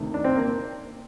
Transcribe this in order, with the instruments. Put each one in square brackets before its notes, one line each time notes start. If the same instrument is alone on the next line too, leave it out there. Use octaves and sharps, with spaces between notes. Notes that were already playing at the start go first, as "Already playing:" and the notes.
Already playing: [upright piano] D2 C3 D#3 A3
[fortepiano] D4
C4
A#3